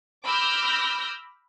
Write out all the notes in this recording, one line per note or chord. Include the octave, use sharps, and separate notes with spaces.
B5 D6 E6 F6 G6 A#6